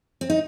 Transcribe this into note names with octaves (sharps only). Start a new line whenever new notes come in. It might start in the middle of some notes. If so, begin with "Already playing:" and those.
C4
D#4